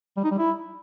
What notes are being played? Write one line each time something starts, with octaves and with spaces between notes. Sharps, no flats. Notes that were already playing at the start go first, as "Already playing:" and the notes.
G3
D#4
G3
E4